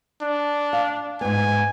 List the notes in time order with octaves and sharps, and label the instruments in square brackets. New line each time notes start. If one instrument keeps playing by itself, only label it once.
[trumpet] D4
[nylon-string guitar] F5
[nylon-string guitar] G#2 B3 [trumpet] G#5